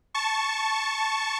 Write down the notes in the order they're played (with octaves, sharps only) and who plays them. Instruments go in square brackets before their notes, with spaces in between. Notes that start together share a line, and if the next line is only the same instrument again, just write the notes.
[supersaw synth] A5 C#6